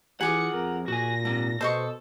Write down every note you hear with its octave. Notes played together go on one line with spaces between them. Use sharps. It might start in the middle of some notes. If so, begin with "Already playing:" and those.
E3 F4 G#4 F#5 D6 D#6 C#7
F2 A#4
A#2 F#4 G#5 A#6
G#2 C3 A5
B2 A4 C5 D#5 C#6